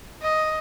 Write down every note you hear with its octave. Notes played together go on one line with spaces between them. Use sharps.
D#5